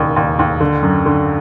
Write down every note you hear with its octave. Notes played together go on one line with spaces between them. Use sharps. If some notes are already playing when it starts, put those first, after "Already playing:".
Already playing: E1 D#2 C#3
D#2
D#2
D3
F#2
D3